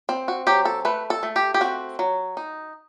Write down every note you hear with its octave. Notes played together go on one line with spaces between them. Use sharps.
C4
F#4
F#3 G4
A4
A3 B4
A4
A3
G4
G4
C4 F#4
F#3
D#4